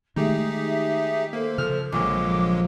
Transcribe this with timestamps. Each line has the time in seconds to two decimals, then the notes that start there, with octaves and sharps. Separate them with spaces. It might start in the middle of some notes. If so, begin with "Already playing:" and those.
0.16 D#3 G#3 A3 D#4 G4 G#4 E5
1.33 A#3 A4 C5
1.58 C#3 F3 F6
1.92 A#1 D3 F#3 G#3 D6